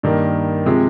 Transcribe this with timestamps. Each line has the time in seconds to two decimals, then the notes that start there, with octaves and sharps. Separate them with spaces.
0.03 G2 D#3 A#3
0.66 C3 F3 G#3